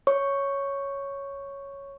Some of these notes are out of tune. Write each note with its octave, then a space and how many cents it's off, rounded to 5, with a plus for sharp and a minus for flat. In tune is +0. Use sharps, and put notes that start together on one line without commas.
C#5 +0 C#6 +0